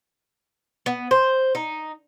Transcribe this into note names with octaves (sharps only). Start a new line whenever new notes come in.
B3
C5
D#4